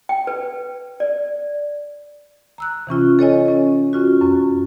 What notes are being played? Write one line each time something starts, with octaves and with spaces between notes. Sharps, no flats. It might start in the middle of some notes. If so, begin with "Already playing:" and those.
G5
B4
D5
A#5 E6 F#6
C3 E3 C#4 F4
A4 C#5 D#5 G#5
C#4
C#4 F4 F#4
F#2 C#4